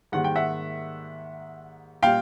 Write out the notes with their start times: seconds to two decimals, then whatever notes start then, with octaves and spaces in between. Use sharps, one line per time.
0.12 G#2 D#3 G3 A#3 F#5
0.24 G5
0.36 E5 F#5
2.02 A#2 G3 F5 G5